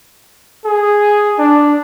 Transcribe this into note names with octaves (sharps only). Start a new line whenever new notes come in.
G#4
D4